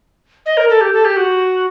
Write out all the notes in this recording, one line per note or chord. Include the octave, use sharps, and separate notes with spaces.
D#5
A#4
A4
G4
A4
G4
F#4